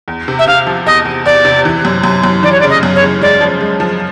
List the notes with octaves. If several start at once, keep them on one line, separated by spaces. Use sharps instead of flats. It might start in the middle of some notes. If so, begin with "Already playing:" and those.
E2
C3
E5
C3 F5
F3
E2 D#5
E2
E2 D5
C3
E3
F#2
F#2
F#2
E3 D5
C#5
D5
C#3
D#5
F#2
C#5
C#3
G#3 D5
F3
G#3
F3